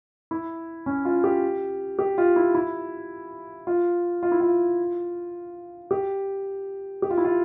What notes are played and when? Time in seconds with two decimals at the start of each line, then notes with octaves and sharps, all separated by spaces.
0.31 E4
0.86 C#4
1.05 F4
1.24 G4
1.99 G4
2.18 F4
2.36 E4
2.54 E4
3.67 F4
4.23 F4
4.31 E4
4.41 F4
5.91 G4
7.02 G4
7.10 F4
7.18 E4
7.24 F4